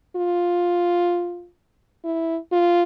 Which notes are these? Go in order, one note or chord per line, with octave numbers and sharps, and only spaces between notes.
F4
E4
F4